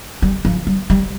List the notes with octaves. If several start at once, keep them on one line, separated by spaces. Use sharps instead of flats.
G3
F3
G3
G3